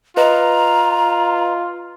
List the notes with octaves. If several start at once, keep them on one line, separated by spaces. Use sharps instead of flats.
F4 B4 D#5 A#5